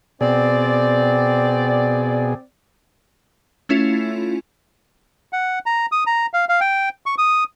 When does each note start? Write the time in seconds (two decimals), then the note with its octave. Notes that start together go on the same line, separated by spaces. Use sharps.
0.21 B2 C4 G#4 D5
3.69 A3 C#4 E4 F4
5.33 F#5
5.66 A#5
5.92 D#6
6.07 A#5
6.33 F5
6.49 F5
6.61 G5
7.06 C#6
7.18 D#6